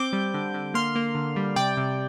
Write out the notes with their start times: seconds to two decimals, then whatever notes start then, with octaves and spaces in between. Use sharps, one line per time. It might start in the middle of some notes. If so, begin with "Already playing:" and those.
Already playing: C4 D6 G6
0.13 G3
0.34 D3
0.54 D3
0.74 A#3 C6 F6
0.95 A#3
1.15 D3
1.36 G3
1.56 C3 D5 G5
1.77 C3